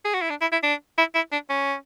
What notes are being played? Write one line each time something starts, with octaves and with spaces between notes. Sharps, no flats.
G#4
F#4
E4
D4
E4
E4
D4
E4
E4
D4
C#4